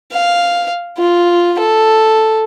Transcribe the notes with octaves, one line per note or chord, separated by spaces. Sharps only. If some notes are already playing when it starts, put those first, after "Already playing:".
F5
F4
A4